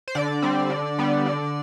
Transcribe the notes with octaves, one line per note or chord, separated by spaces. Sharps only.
C5
D3 D5
G3 C4
D3
G3 B3
D3